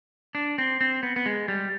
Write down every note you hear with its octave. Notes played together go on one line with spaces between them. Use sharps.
D4
C4
C4
B3
B3
G#3
G3